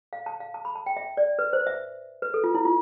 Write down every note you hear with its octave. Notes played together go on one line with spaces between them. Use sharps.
F5
A5
F5
A5
B5
A5
G5
E5
D5
B4
C5
E5
B4
A4
F4
E4
F4